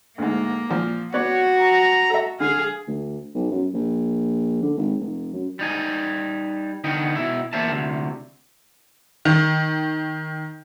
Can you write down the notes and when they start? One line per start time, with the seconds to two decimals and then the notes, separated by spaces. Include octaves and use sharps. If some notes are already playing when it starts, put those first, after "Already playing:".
0.18 D2 G#2 A#3
0.69 A#2 F3
1.14 B3 F#4 C#5 D5 F#6
1.59 A#5
2.10 A4 E5
2.40 D3 G#4 F5
2.87 D2
3.34 B1
3.51 F#2
3.74 A#1
4.62 D3
4.77 G#1
5.00 F1
5.33 F#2
5.59 G3 D#4 G#5
6.84 D3 B3 D#4 G5
7.15 B2 E4
7.53 E2 A#3 C5 E5 A5
7.71 D2 C3
9.25 D#3